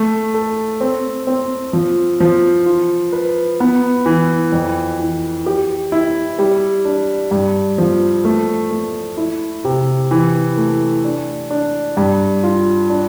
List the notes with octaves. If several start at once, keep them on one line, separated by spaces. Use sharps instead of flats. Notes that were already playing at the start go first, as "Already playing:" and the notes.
Already playing: A3
A4
C4
C4
F3
F3
F4
B4
B3
E3
F2
E3
G4
E4
G3
D4
G2
F3
A3
A3
E4
C3
E3
A3
D4
D4
G2
F4
D4